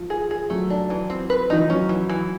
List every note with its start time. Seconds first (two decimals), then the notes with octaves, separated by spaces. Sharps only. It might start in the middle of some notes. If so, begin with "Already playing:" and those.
Already playing: F3
0.10 G#4
0.31 G#4
0.50 F#3 A3
0.70 D4
0.90 E3
1.10 C4
1.30 B4
1.50 E3 D#4
1.60 F3
1.70 F#3 C#4
1.89 E3
2.10 E3